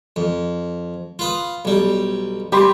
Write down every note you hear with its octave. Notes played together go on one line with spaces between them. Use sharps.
F2
F4 B4 D#6
B1 G3
G3 G4 B5 C6